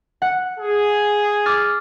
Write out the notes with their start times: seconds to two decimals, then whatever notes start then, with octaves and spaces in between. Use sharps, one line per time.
0.22 F#5
0.58 G#4
1.46 D6 F6 A6